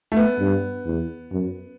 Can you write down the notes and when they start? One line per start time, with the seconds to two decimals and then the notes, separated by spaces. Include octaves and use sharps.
0.12 A3
0.16 B3
0.39 G2
0.85 E2
1.32 F#2